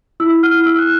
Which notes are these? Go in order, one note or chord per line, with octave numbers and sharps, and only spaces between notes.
E4 E6
F6
E4
E6
F#6